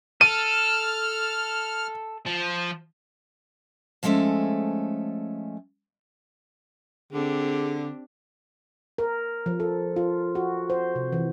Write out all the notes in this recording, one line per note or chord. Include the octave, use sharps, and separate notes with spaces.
A4 F6 D#7
F3
F3 G#3 A3 C#4 A4 E5
D3 C4 D4 G4 G#4
A#4
F3
A4
F4
F#4
C5
C3
E3